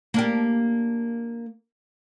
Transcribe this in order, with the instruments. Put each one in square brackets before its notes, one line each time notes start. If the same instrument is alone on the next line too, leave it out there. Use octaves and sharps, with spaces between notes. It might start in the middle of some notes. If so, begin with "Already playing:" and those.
[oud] A#3 D4 G4